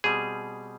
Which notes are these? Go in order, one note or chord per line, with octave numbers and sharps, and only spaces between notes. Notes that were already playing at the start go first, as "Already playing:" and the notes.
B2 G3 C4 G#4